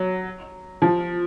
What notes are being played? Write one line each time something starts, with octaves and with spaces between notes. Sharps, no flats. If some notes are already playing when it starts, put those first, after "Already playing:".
Already playing: F#3
F3